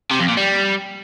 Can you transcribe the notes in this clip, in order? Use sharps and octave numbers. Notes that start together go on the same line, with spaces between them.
C3
F2
A#2
G3